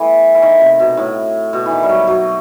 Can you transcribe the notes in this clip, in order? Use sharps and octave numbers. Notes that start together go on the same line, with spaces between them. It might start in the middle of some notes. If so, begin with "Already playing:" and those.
Already playing: E3 A3 B3
E3
D#3
C3
B2
A2
B2
D#3 E3
G3
F#3
F#3